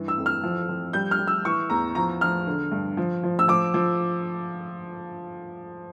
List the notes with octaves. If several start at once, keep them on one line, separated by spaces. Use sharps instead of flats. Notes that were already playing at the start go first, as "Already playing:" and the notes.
Already playing: G2 E3
E6
F2
F6
F3
F3
G3 G6
F6
G3
E6
E3 C#6
E2 A#5
F3 A#5
F3 F6
D3
G2
F3
F3
E6
F3 D6
F3